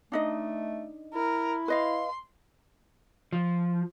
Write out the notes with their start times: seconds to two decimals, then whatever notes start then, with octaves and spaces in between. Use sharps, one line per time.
0.12 A3 D4 D#4 D#5
1.15 E4 A#4
1.68 B4 D#5 F5 C6
3.33 F3